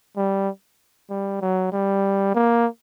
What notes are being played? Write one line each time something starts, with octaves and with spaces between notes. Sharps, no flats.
G3
G3
F#3
G3
A#3